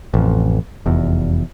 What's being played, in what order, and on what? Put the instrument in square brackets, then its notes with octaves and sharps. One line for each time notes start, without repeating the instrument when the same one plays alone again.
[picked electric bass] A1 F2
F1 E2